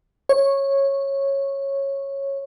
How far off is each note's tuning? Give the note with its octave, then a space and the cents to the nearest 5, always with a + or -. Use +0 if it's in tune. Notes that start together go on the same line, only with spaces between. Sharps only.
C#5 -10